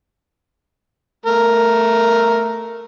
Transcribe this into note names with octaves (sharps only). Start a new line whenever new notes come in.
A3 A#4